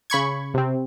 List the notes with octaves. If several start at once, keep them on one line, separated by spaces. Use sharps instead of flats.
C#3 B5 C#6 G#6
C3 C4